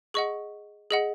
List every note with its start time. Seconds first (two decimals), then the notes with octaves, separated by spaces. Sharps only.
0.14 G#4 D#5 F#5 C#6
0.91 G#4 D#5 F#5